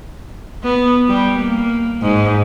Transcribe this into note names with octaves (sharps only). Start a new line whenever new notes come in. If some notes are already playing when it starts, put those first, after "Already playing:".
B3
G3
A#3
G#2